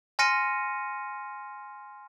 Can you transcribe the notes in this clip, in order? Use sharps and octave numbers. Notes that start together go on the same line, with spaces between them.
G#5 C6 F6 A#6 C#7 D#7